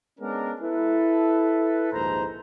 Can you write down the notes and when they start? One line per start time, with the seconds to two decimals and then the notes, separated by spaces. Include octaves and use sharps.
0.19 G#3 B3 C#4 D4 A#4
0.60 E4 A4 B4
1.92 A#1 D#2 G#2 C5 A#5